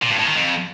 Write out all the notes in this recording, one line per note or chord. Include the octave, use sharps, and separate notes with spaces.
A#2
G2
A2
D#3
F2